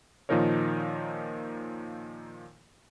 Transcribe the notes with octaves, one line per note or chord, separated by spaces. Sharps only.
A#2 D#3 F3 D#4 A#4 C#5